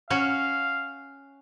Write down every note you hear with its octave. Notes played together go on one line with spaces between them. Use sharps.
C#4 F#4 F5